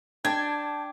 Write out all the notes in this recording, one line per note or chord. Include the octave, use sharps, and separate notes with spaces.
D4 G5 A5 G#6